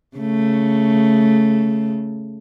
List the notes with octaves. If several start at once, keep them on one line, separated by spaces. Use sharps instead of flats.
C#3 A3